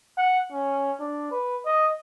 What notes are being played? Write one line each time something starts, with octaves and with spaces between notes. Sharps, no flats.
F#5
C#4
D4
B4
D#5